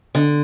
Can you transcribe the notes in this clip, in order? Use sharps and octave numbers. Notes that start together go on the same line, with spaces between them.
D3